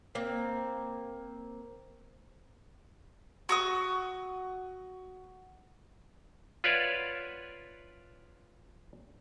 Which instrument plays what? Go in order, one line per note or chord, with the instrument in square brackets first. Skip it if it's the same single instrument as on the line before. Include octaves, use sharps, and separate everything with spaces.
[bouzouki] A#3 C4
[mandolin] F#4 C#6 D#6
[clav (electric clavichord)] F4 B4 C#5 D5 E5 F#5